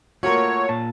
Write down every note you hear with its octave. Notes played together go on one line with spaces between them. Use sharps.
A3 A#3 F4 F#4 A#4 C#5
A#2 A5